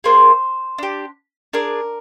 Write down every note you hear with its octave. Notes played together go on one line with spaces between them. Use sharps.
A#3 F4 G#4 C5
D4 G4
D4 G#4 A#4